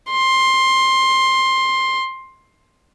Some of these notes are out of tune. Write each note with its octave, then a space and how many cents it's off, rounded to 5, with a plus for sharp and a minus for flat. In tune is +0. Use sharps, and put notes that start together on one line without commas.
C6 +15